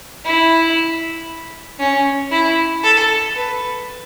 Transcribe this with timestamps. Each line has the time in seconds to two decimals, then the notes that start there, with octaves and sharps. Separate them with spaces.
0.25 E4
1.80 C#4
2.31 E4
2.84 A4
3.35 B4